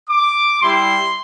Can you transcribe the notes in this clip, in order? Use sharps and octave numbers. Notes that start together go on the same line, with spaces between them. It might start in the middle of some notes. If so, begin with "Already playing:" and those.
D6
G3 E4 G4 C6